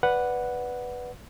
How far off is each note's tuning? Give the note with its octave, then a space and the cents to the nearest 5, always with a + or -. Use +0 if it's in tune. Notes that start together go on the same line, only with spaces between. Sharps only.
B4 +0 D5 +0 F#5 +0